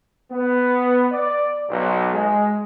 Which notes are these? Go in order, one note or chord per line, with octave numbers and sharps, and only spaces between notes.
B3
D5
B1
G#3